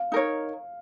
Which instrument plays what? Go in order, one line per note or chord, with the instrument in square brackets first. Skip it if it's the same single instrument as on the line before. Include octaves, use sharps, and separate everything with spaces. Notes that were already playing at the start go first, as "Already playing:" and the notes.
Already playing: [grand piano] F5
[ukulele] D#4 A#4 C#5